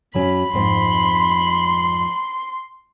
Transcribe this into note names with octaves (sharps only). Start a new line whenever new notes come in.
F#2 F#3 C#4 B5
F2 G#2 C4 C6